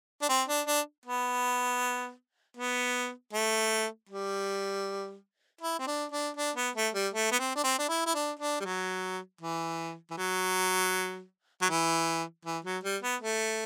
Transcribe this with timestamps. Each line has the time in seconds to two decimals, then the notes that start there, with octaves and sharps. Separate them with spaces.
0.22 D4
0.29 C4
0.48 D4
0.67 D4
1.06 B3
2.57 B3
3.33 A3
4.09 G3
5.61 E4
5.79 C4
5.87 D4
6.12 D4
6.37 D4
6.56 B3
6.76 A3
6.94 G3
7.14 A3
7.32 B3
7.39 C4
7.55 D4
7.64 C4
7.79 D4
7.89 E4
8.06 E4
8.14 D4
8.39 D4
8.60 G3
8.65 F#3
9.41 E3
10.10 E3
10.17 F#3
11.62 F#3
11.70 E3
12.45 E3
12.65 F#3
12.83 G3
13.02 B3
13.21 A3